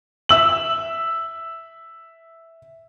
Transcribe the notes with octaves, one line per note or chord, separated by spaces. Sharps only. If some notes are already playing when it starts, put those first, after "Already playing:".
E5 E6 F#7